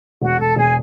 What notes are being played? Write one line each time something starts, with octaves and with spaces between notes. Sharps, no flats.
E1 F#4 F#5
E1 A4 A5
E1 G#4 G#5